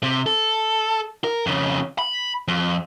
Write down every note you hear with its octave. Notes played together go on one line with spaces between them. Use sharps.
C3
A4
A#4
F2 C#3
B5
F2